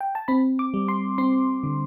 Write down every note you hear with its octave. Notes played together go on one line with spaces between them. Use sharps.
G5
A5
C4 B5
D6
G3
C6
C4 C6
D3